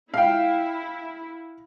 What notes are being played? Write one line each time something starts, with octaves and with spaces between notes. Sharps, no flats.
E4 F5 G5